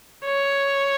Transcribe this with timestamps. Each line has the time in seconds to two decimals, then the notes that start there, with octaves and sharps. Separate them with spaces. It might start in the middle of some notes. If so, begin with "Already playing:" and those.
0.25 C#5